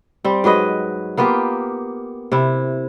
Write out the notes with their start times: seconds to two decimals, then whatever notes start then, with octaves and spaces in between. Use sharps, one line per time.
0.25 G3 C4
0.44 G#2 F#3 B4 D#5
1.17 A#3 B3 F4 G4
2.32 C3 E4